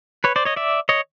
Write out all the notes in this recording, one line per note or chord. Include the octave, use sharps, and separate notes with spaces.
B4 C#5
C5 D5
C#5 D#5
D5 E5
C#5 D#5